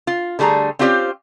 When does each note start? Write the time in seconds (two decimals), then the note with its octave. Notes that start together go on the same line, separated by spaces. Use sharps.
0.07 F4
0.39 D3 G3 A3 G#4 A#5
0.79 C4 C#4 F4 G4 C5 D5